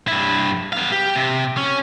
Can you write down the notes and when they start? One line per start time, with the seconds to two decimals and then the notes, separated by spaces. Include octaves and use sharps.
0.08 G2 E4
0.72 B3 F5
0.92 G4
1.15 C3
1.57 C#4